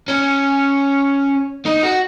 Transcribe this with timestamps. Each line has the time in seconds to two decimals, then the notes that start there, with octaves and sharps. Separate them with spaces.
0.08 C#4
1.66 D#4
1.83 F#4